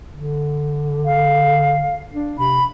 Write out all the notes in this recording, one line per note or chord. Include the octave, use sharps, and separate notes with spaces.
D3
F5
D4
C3 B5